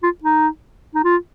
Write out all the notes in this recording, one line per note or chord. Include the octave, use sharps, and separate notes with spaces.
F4
D#4
D#4
F4